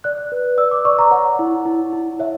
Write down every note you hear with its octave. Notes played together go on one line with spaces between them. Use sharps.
D5 F#6
B4
D5 E6
D6
D5 C#6
A#5
C#5 F#5
E4
E4
E4
C#5 E5